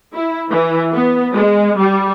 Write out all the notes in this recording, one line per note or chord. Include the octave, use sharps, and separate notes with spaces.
E4
E3
B3
G#3
G3